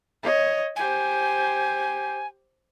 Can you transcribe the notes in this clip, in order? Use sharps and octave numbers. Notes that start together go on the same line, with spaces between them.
C#5 D#5
G4 C5 G#5